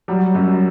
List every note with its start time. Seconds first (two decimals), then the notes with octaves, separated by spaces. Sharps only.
0.08 F#3 G3
0.35 F#2